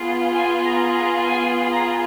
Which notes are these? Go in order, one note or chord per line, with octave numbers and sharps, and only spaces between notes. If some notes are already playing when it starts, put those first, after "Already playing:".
Already playing: B3 F4 G#4
G#5
A#5
A#5
G#5
A#5